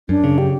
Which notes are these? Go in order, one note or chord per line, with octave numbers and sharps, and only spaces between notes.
F#2 D4
C#3
G4